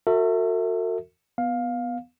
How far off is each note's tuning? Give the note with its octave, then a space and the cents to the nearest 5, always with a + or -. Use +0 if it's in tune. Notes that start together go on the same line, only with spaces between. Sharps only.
F#4 -20 A4 +45 E5 -10
B3 +0 F5 +15